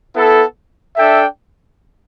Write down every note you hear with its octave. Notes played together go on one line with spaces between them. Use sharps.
B3 E4 A4
D4 A4 E5 G5